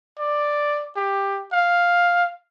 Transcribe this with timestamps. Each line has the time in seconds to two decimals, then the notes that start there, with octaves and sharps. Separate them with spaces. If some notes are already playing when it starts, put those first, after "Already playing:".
0.19 D5
0.96 G4
1.53 F5